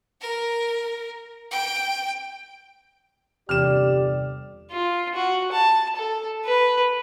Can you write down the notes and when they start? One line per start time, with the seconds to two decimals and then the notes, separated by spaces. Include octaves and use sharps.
0.21 A#4
1.51 G5
3.49 G1 E2 C3 G4 D5 F6 E7
4.71 F4
5.15 F#4
5.52 A5
5.96 A4
6.45 B4